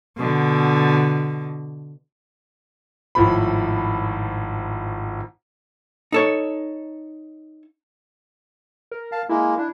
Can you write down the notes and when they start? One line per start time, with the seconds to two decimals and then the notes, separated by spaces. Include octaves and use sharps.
0.18 B2 D3
3.15 G#1 A2 F3 B5
6.12 D#4 A4 C#5
8.91 A#4
9.12 F5 A5
9.29 G#3 A#3 E4
9.58 D4 E4